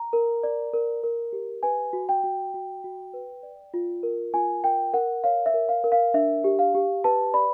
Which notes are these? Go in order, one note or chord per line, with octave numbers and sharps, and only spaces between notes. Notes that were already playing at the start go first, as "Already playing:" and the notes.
Already playing: A#5
A#4
D5
A#4
A#4
G4
B4 G#5
F#4
G5
F#4
F#4
F#4
B4
D5
F4
A#4
F4 G#5
A#4 G5
A#4 F#5
C#5 F5
E5
A#4
F5
A#4
F5
D4 E5
G4
F5
G4
B4 A5
D5 B5